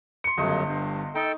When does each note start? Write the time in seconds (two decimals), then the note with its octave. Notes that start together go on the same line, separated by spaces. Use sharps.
0.24 C6 C#7
0.37 G1 F#2 C#3 F#3 A3 C5 D#5
0.65 G2
1.15 D#4 A4 G5